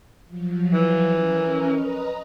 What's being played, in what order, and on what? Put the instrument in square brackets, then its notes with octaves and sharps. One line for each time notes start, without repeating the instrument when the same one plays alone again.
[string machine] F3 F#3
[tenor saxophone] E3
[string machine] C#4 A#4
B4 D#5 A#5